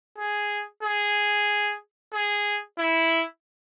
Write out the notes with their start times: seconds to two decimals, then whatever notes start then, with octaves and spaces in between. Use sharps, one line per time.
0.18 G#4
0.83 G#4
2.14 G#4
2.79 E4